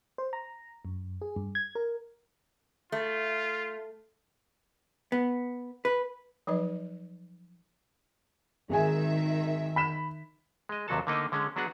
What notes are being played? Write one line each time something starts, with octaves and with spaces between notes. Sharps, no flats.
C5
A#5
F#2
G#4
G2
G#6
A#4
A3 F4
B3
B4
F3 F#3 D#4 B4 D#5
G#1 D#3 G#3 E5 G#5
B5 B6 E7
G#3 D#5
D#2 C3 F#3 F#4 A4 A5
D3 A3 A#3 D#4 D#5 G5
D3 G#3 C#4
F#3 B3 D4 F#4 G#4 F#5